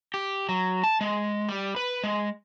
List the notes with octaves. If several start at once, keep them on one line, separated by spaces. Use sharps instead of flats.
G4
F#3
A5
G#3
G3
B4
G#3